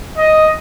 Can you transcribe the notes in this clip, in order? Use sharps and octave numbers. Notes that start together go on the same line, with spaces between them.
D#5